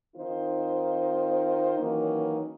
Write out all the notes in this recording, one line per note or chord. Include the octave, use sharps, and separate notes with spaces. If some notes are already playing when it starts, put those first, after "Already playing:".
D#3 C4 D#4 F4 C5
D#3 E3 F#3 A#3 C#4 D#4